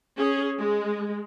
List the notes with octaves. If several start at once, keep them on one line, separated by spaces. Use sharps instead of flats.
C#4 G#4
G#3